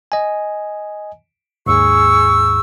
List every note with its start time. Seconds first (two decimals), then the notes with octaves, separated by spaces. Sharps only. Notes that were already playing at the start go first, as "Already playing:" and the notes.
0.12 D#5 G#5
1.66 D#2 G#2 G#4 C#6 E6